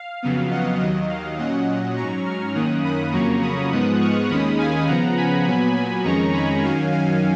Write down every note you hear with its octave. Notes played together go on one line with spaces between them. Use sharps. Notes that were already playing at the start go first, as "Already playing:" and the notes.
Already playing: F5
F2 C#3 F#3 B3
D#5 F#5
D#2 D#3 F#3 D#5
F5
A#2 F#3 C#4 D#5 F#5
G#2 F#3 C#4 A#5 C#6
C#6 F6
F#2 D#3 A#3 C#4 D#6 F#6
B5 D#6
F2 C#3 F#3 A#3 C#4 A#5 C#6
B5 D#6
G#2 F3 G#3 B3 D#6 F#6
C#6 F6
D#2 D#3 G#3 C#4 B5 D#6
F5 G#5
C#3 F3 B3 F#5 A#5
G#5 B5
A#2 F#3 B3
G#5 B5
F2 D#3 G#3 C#4 A#5 C#6
G#5 B5
F#2 D#3 F#3 C#4 F5 G#5
F5 G#5